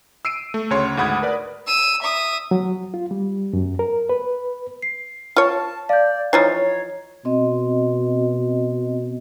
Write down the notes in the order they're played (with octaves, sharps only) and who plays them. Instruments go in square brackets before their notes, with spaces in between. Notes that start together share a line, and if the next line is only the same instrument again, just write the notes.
[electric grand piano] E6 C7 D7 D#7
A3
D2 C#3 C#5 C6
D2 G#2 F#5 B5 D#6 G#6
A#4 B4 D5
[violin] E6 D#7
E5 D#6
[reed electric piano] F#3
F4
G3
F#2
A#4
B4
[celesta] C7
[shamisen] F4 C#5 [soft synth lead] A5
[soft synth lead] D5 [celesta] F5 G6
[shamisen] E3 F3 D#4 [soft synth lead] C#5 [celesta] A#5 A6 C7
[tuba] B2 [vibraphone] C4 D#5